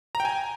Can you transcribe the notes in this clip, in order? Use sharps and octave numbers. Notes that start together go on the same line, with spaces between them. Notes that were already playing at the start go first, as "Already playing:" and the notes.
A#5
G5
G#5